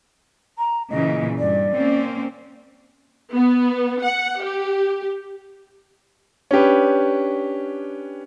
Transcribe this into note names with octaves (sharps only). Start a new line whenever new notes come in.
A#5
A#2 C#3 E3 D#5
G2 D5
A#3 C4 C#4
B3
F#5
G4
C#4 D4 G4 B4